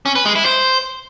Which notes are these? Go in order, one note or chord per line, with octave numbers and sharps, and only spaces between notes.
C#4
B4
G#3
E4
C5